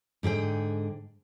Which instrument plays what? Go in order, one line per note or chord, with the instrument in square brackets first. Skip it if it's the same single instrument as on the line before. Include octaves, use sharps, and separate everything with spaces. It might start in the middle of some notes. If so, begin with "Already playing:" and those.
[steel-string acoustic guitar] G#2 D3 G#4 G5